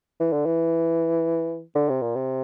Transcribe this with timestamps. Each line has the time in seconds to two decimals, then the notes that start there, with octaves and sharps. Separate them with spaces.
0.20 E3
0.33 D3
0.46 E3
1.75 D3
1.89 C3
2.02 A#2
2.16 C3